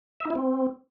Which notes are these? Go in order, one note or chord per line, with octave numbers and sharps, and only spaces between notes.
E5
D#4
E4
C4